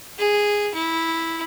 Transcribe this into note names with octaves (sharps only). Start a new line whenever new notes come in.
G#4
E4